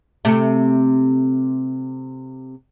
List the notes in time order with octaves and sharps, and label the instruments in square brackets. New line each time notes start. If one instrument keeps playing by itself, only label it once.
[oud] C3 A3